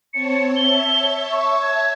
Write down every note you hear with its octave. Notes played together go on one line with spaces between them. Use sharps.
C4 C#5 A5 C#7
C#5 E5 A5 G7
C#6
G#6